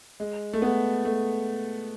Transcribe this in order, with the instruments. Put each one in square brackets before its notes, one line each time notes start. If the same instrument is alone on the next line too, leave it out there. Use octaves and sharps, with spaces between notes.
[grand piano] G#3
A3
B3
A3